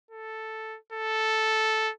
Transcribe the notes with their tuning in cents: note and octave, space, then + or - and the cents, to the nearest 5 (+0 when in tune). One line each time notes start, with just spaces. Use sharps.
A4 +0
A4 -5